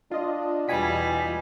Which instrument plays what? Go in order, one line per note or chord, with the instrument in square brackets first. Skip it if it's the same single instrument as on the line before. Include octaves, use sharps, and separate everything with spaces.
[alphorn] D4 [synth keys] F4 D#5
[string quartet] E2 G3 [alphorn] B2 [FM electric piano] G#5 B6